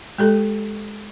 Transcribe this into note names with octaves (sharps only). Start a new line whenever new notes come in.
G#3 G4 A4